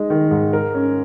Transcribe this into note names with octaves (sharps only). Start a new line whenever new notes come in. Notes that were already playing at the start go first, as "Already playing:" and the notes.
Already playing: G#3 D#4
D#3
G#2
A#4
C#4